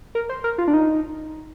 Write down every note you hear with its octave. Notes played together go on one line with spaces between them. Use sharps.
A#4
C5
A#4
F4
D4
D#4